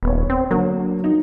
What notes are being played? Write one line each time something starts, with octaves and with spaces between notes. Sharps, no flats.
D#1 B3 C#5
C4
D3 F#3 A#3
D#4